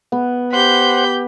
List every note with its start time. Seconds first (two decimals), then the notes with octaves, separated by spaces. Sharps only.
0.12 B3
0.53 G4 C5 F#5 B5 G6